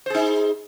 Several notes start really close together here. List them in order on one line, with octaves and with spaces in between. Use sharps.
C5 G#4 D#4